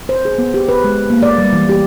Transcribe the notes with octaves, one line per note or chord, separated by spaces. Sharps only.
C5
G#4
B3
G4
B4
G#3
A#3
D5
G3
E3
G4